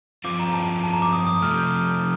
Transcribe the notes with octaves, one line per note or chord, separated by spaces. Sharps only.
G2 F3 C4 F4 D6
A#5
A5
A5
A#5
D6
D#6
D#6
C3 F3 A3 F6
G6